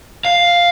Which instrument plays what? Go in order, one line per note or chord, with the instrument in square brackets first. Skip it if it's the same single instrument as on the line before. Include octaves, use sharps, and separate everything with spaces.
[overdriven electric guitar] F5